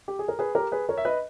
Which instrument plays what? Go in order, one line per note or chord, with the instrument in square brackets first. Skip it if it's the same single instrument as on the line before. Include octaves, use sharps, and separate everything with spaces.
[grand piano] G4
G#4
A#4
G#4 B4
G4 A#4
G#4 B4
A#4 C#5
E5
B4 D#5